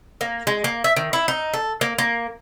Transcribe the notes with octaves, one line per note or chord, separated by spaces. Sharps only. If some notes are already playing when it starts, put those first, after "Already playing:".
A#3
G#3
A#3
E5
D#3
E4
D#4
A4
A#3
A#3